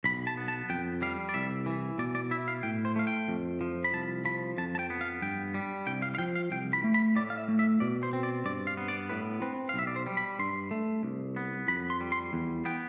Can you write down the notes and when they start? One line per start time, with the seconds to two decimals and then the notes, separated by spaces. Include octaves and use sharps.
0.04 B1 B5
0.27 A5
0.37 B3
0.48 A5
0.70 F2 G5
1.02 G3 F5
1.29 D5
1.34 C2 E5
1.66 E3
1.98 B2 D5
2.15 D5
2.31 E4 E5
2.48 F5
2.63 A2 G5
2.85 C5
2.96 A3 F5
3.07 G5
3.28 F2
3.61 F3
3.84 B5
3.93 C2 A5
4.25 F3 B5
4.58 F2 A5
4.75 A5
4.79 G5
4.90 B3
5.01 F5
5.22 G2 G5
5.54 G3
5.87 C2 G5
6.02 F5
6.15 F5
6.18 F3 G5
6.35 F5
6.51 C2 G5
6.73 B5
6.84 A3
6.94 B5
7.16 A2 D5
7.30 F5
7.38 E5
7.48 A3
7.59 E5
7.80 B2 D5
8.03 C5
8.13 C4
8.23 D5
8.45 G2 D5
8.67 F5
8.77 B3
8.88 D5
9.09 A2 B4
9.42 C4 B4
9.69 F5
9.74 B1 E5
9.87 D5
9.96 C5
10.07 G3
10.17 B5
10.39 G2 C6
10.71 A3
11.03 C2
11.36 B3
11.68 F2 B5
11.90 C6
12.01 G3
12.12 C6
12.33 E2
12.65 B3 G5